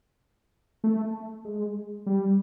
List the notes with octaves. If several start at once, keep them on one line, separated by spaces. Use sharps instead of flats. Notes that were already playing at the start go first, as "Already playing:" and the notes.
A3
G#3
G3